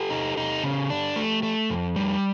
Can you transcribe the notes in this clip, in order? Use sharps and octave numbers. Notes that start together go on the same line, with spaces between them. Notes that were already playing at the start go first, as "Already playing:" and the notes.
Already playing: G4 A4
D#4
D#4
C#3
D4
A3
A3
F2
G3